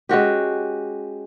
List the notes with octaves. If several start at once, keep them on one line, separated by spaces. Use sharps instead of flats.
G#3 C#4 F#4 G4